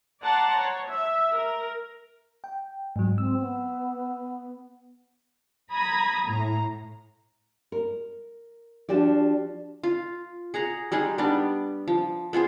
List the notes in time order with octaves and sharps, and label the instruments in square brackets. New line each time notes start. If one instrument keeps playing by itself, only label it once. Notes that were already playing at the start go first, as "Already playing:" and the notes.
[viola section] D5 F#5 A5 A#5 C6
C#5
E5
A#4
[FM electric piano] G5
G#2 F#3
[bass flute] C4 [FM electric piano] E6
[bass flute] B3
[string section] A#5 B5 D#6 G#6
A2 A#5
[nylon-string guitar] A#4
F3 D4 F#4 G4 D5
[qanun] F4
G#4 F#5 A#5
G3 G#3 D#4 G#4
G3 B3 D4
F3
B3 F4 G#4 C5